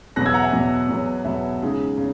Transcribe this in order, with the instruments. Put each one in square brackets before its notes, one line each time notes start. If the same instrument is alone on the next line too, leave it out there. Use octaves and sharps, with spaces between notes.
[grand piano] E2 B2 F#3 B3 F#6 A#6
E6 G#6
F#5 A#5
E5 G#5
E2 B2 F#3 B3
E2 B2 F#3 B3
E2 B2 F#3 B3 E5
C#3 G#3 D#4
C#3